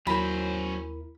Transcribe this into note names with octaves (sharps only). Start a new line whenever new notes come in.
D#2 F#3 C#4 E4 A#4 C5 B5